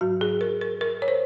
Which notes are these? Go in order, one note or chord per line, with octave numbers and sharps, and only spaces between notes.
G#2 F#3 F#4
G#4
A#4
A#4
A#4
C#5
C5